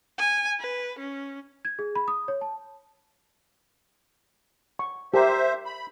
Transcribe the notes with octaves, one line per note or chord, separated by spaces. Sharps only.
G#5
B4
C#4
G#6
G#4
B5
D#6
C#5
A5
C#6
G4 A#4 C5 E5 A#5
B5